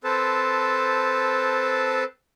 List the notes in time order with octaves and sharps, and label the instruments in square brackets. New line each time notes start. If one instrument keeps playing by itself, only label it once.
[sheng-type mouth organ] C4 A4 B4 C5 A5